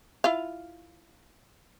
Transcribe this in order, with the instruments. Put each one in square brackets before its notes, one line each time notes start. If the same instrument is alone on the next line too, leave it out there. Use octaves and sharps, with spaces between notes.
[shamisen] E4 F4 F5